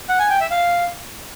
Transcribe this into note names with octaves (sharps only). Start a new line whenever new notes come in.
F#5
G#5
G5
E5
F5